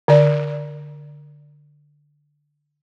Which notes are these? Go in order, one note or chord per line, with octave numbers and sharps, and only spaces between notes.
D3 D5